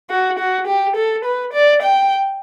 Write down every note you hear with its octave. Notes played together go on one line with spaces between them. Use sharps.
F#4
F#4
G4
A4
B4
D5
G5